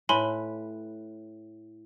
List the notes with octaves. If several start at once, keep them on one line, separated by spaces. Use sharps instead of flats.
A2 B4 G#5 B5 C6